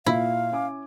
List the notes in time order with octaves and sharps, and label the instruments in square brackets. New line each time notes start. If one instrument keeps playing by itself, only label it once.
[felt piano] A#2 [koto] E4 [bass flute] F5
[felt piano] C#4 G#5 D6